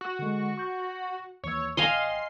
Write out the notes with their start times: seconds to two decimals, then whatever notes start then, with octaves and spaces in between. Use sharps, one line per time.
0.01 F#4
0.19 D3 G#3
0.58 C#6 G6
1.44 D#2 E3 C#5 E6
1.77 A1 D#5 F5 G5 G#5 C6